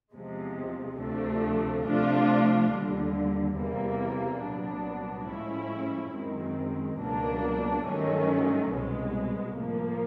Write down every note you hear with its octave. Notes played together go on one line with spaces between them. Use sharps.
E2 C3 F3 G#3
D2 C3 F3 A3 D4
C3 F3 A3 D4 F4
D#2 D3 G3
E2 C3 E3 G3 A#3
C2 A#2 F#3 B3 D4
A2 F3 G#3 C#4 E4
F#2 D#3 G#3 C4
C#2 B2 F#3 A#3 D4
G2 D#3 F#3 A3 C#4
C2 B2 G#3
A2 F3 A#3